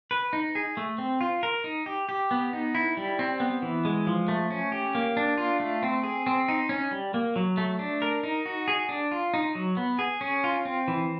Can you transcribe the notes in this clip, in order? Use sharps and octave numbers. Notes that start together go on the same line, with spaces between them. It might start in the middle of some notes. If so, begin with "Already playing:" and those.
B4
D#4
G#4
A3
C4
F4
A#4
D#4
G4
G4
B3
D#4
E4
G3
C4
B3
E3
G#3
F3
A3
C#4
G4
A#3
D4
F4
A3
C4
G#4
C4
D#4
C#4
G3
A#3
F#3
A3
D4
A#4
D#4
F#4
G#4
D4
F4
D#4
F#3
B3
G#4
C#4
F4
C4
E3